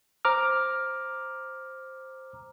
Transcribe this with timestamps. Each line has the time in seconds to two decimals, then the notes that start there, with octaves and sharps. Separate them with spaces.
0.25 C5 A#5 D6 F6